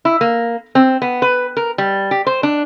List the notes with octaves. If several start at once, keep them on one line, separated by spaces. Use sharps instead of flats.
E4
A#3
C4
B3
B4
A#4
G3
G4
C5
D4